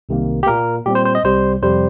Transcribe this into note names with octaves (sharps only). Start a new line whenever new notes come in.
C2 C3 D#3 A#3
G4
A#2 A#3 A#4
A#2 G3 C4 G4
C5
C5
D#5
C2 C3 G3 C5
F2 C3 G3 C4 C5